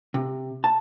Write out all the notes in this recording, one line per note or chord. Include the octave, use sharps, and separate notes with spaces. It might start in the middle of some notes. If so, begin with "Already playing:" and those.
C3
A5